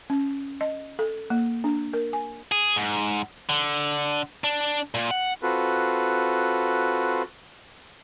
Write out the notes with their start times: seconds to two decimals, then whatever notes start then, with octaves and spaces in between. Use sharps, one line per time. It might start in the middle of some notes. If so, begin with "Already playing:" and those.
0.10 C#4
0.61 D#5
0.99 A4
1.30 A#3
1.64 D4
1.93 A#4
2.13 G#5
2.52 G#4
2.76 G#2
3.49 D3
4.44 D4
4.95 A#2
5.11 F#5
5.42 C4 F4 F#4 A4 B4